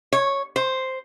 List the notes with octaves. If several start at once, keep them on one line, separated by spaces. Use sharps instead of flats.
C#5
C5